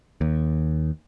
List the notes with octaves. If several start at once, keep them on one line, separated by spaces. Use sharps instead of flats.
D#2